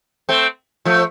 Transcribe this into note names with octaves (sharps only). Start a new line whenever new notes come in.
A3 C4
F3 A3